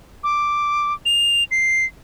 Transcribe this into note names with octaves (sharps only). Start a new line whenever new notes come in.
D6
F7
C7